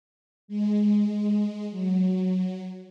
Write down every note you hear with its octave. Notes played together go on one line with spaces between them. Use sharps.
G#3
F#3